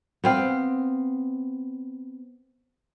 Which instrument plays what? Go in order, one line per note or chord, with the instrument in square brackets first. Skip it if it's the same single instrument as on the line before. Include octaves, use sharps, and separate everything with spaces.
[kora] B3 C4 F5